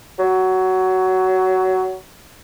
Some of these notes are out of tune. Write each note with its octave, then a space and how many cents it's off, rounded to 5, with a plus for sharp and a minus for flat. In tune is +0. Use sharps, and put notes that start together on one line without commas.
F#3 +15